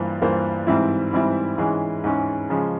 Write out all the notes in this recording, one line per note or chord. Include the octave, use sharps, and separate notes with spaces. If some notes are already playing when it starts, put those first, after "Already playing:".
Already playing: G2 E3 A#3 F4 C5
G2 E3 A#3 F4 C5
G#2 E3 G3 C4 E4
G#2 E3 G3 C4 E4
G#2 E3 G#3 C#4
G#2 E3 G#3 C#4
C#3 F3 G#3